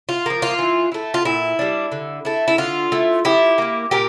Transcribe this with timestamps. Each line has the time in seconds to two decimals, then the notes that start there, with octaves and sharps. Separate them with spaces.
0.09 F4
0.26 F3 A#3
0.42 F4
0.59 E3
0.92 A3 E4
1.14 F4
1.25 A#2 E4
1.59 G3 D4
1.92 D3
2.25 A3 E4
2.48 E4
2.58 D3 F4
2.92 A3 E4
3.25 F3 E4 G4
3.58 A#3 E4
3.91 A#2 G4 A#4